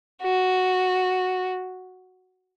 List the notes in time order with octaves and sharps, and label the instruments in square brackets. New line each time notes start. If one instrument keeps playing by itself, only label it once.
[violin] F#4